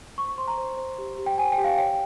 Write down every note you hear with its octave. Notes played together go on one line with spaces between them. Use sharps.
C5 C#6
C#6
C5 C6
A#5
C5
C5
G4
G4
G5
C5 G#5
G5
G4
F5
C#5 G5